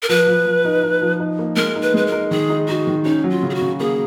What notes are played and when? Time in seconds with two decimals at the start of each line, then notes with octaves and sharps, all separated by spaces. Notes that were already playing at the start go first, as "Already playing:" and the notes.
0.03 A#4
0.09 F3 B4
0.27 F3
0.46 F3
0.65 D#4
0.83 D#4
1.01 F3
1.19 D#4
1.39 A#3
1.56 G#3 A#4
1.76 D#4
1.82 B4
1.94 G#3 B4
2.06 A#4
2.12 D#4
2.31 D#3 G#4
2.50 D#4
2.68 D#4 F#4
2.87 D#3
3.05 C#4 D#4
3.24 F#3
3.30 F4
3.43 C#3
3.50 G#4
3.55 F#4
3.61 C#3
3.79 A#3 G#4